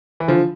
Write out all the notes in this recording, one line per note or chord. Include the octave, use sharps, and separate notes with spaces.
E3
D3 F3